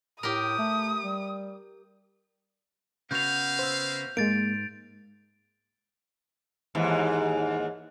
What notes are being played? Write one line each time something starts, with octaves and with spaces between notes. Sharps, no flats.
A2 G4 A#4 D#6
A3
G3
C#3 A#3 B3 F#4 E5 F5 G6 F7
C5 E6
G#2 G#3 A#3 A6 D7
D#2 G#2 E3